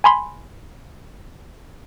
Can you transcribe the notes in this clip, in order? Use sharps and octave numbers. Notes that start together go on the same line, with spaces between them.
G#5 B5 C6